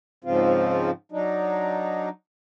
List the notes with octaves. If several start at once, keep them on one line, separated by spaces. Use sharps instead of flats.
G#2 C#3 F3 C4 F4
F#3 D4 D#4